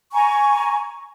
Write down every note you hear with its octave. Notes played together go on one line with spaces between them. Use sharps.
G#5 A#5 C#6